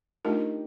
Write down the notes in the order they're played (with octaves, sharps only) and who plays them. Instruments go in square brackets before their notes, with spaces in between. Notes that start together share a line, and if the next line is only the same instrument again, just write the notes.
[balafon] A3 D4 F4 A#4 [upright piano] D#4 G4